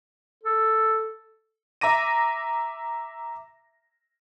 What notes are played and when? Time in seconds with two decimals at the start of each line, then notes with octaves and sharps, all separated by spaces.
0.44 A4
1.81 E5 A#5 D6 A#6 D#7